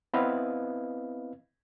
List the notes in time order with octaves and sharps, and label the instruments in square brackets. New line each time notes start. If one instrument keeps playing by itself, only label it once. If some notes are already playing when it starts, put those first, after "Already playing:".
[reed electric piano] B3 C4 E4 B4 D#5 F5